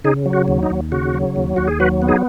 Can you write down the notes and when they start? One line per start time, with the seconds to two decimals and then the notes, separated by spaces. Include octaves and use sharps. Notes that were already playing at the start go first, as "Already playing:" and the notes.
0.04 C#3 D#4 G#4
0.26 F#3
0.33 F#4
0.48 D#2
0.63 D#4
0.70 D#2
0.92 C#3 F#4
1.14 F#3
1.36 D#2
1.56 D#2 F#4
1.67 G#4
1.80 F#3 F#4 B4
2.02 B3
2.08 D#4 G#4